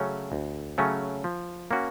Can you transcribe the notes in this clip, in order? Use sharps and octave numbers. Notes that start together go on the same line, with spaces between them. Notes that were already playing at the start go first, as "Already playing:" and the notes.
Already playing: C#3 F#3 A3 C#4
D2
C#3 F#3 A3 C#4
F3
A#3 C#4 F#4